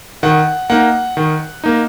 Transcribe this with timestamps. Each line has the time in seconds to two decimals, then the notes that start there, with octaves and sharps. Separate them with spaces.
0.23 D#3 F#5
0.70 A#3 D#4 F#5
1.17 D#3
1.64 A#3 D#4